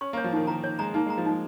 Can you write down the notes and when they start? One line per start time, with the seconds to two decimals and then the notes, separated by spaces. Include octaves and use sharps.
0.01 C#4 C#6
0.13 A#3 C#5
0.24 F3
0.32 D#3 D#4
0.47 D#3 A#5
0.64 C#5
0.79 G#3 A#5
0.94 A#3 D#4
1.06 G#3 A#5
1.18 F3
1.25 G#3 D#4